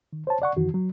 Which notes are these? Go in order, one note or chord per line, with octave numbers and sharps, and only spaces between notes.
D#3
C5 C#5 A5
D5 F#5 C#6
F#2 D#3 E3 F#4
F#3